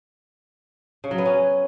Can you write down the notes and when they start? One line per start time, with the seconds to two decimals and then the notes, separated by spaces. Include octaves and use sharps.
1.04 C#3
1.11 F#3
1.18 B3
1.26 C#4